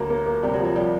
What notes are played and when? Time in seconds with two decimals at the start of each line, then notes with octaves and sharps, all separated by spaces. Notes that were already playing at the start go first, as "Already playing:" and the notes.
Already playing: D2 F#3 A#3
0.10 A#3
0.26 A#3
0.43 C3 G3
0.54 F#3
0.59 F3
0.64 F#3
0.75 F3 G3